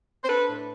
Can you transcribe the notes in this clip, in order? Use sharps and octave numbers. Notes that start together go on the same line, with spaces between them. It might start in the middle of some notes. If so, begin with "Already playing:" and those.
C5
D4 A4 B4
A2